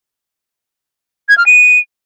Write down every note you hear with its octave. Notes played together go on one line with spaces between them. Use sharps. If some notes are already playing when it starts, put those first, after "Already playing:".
G#6
F6
D#7